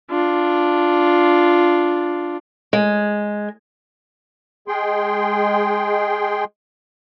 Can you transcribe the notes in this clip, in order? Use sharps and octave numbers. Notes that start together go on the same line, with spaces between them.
D4 F4
G#3
G#3 G#4 G5 C6